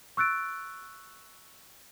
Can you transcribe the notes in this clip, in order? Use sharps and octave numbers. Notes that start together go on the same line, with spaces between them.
C#6 E6 F#6 A6 D7